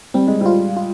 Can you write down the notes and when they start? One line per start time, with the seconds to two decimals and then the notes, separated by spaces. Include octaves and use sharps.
0.14 G3 C4
0.27 G#3
0.41 G3 F4
0.76 F4